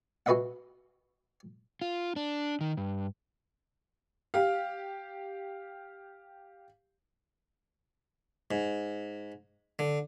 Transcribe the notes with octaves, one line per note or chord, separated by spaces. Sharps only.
F#4 G#4 B4 D#5 E5 F#5
F4
D4
D#3
G2
G4 F5
G#2
D3